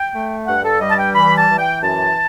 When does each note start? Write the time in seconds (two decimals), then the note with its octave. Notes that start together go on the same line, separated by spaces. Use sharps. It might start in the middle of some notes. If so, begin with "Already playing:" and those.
Already playing: G5
0.14 A3
0.47 G2 F#5
0.64 A4
0.80 G3 D#5
0.90 A5
0.98 G5
1.14 E3 B5
1.37 A5
1.49 E3
1.59 G5
1.82 F#2 A5